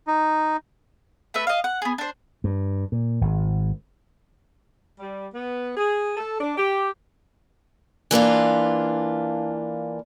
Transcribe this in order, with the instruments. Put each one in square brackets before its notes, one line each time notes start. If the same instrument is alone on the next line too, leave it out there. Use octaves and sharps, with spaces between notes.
[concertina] D#4
[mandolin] A3 B4 E5
D#5 F5
F#5
B3 G#4
D4 C5
[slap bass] G2
A#2
G#1
[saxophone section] G3
B3
G#4
A4
D4
G4
[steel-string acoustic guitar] E3 A#3 D4 F4